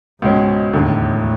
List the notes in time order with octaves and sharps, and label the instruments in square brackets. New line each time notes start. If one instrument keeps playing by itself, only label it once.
[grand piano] C#2 B2 G#3 C#4 [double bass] G#2
[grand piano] E1 D#2 D3 [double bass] A2